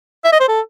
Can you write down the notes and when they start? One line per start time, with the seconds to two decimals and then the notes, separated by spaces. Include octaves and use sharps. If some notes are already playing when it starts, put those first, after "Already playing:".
0.25 E5
0.33 D#5
0.40 C5
0.49 A4